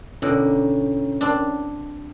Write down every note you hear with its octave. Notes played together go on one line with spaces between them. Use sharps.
B2 D3 C#4 E4 C#5
C4 D4